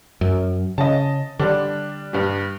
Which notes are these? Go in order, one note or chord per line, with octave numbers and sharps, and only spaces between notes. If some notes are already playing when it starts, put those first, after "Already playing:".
F#2
C#3 D#5 A5
D3 G3 D4
G2 G3